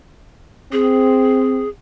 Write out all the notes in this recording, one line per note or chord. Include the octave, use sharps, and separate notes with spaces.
C4 G#4